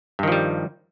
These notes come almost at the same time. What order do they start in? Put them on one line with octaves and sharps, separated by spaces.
G2 D#3 F3 G3